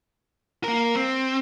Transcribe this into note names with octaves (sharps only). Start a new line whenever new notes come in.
A#3 A#4
C4